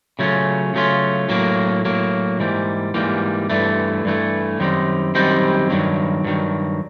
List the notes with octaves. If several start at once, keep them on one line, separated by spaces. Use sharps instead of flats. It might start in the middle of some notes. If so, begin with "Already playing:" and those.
C#3 F#3 A3 C#4 F4
C#3 F#3 A3 C#4 F4
A2 F#3 A#3
A2 F#3 A#3
G#2 E3 G3 A#3
G#2 E3 G3 A#3
G2 E3 A3
G2 E3 A3
F#2 D#3 G3 C4 D#4
F#2 D#3 G3 C4 D#4
G2 D#3 F#3
G2 D#3 F#3